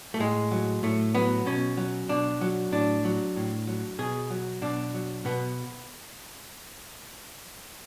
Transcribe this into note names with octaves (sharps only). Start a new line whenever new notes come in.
A3
A2 G#3
F#3
A2 A3
F#3 B3
B2 C#4
F#3
B2 D4
F#3
A2 D4
F#3
A2
F#3
B2 G#4
F#3
B2 D4
F#3
B2 B3